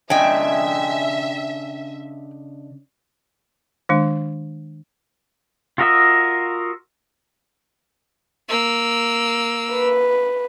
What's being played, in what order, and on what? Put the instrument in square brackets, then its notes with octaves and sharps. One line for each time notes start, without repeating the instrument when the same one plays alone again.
[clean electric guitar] C#3 D4 D#5 [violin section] E5 [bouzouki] G5 G#5
[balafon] D#3 G#3 D4
[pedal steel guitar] F4 F#4 A#4 D#5 E5
[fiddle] A#3 E6
[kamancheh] B4